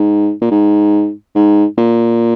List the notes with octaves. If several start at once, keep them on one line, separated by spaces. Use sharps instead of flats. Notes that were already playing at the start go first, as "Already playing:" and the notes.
Already playing: G#2
A#2
G#2
G#2
A#2